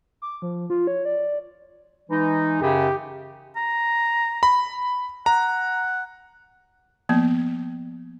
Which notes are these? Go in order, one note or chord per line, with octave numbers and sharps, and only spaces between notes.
D6
F3
F4
C#5
D5
E3 G#3 D#4
F#2 C#3 G4
A#5
B5
F#5 A#5
F3 A#3 B3